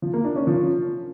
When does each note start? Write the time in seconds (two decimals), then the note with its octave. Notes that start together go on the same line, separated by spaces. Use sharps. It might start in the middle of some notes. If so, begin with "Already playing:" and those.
0.02 F3
0.13 A#3
0.25 D4
0.36 C#4
0.47 F3